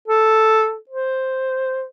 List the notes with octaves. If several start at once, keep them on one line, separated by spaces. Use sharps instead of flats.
A4
C5